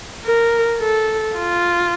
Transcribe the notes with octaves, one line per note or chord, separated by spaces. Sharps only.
A#4
A4
F4